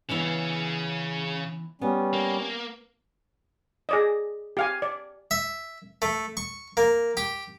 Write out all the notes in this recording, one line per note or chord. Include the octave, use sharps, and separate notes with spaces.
C#3 E3 B3 C#4 E4
G3 B3 C#4
A#3
G#4 D5 D#5
G4 F5 G#5
D5
E5
A3
C#6
A#3
G4